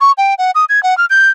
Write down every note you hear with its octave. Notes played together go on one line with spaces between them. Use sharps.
C#6
G5
F#5
D#6
G#6
F#5
F6
G6